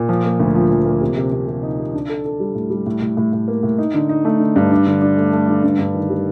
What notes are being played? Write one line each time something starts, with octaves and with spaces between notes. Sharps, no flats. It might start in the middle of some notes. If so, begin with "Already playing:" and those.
Already playing: A#2
F3
A#3
D2
F3
F3
A#3
C3
C3
C3
C3
D#4
C3
D4
A4
A4
G3
A2
G3
A2
A2
A2
A2
A#3
A2
D#4
D3
D#4
A3
D3
G2
D4
D3
D4
A3
A3
D3
G2
G2
D#3
G3